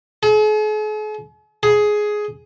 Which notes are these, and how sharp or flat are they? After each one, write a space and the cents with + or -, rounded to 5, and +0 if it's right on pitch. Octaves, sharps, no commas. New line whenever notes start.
G#4 +45
G#4 +10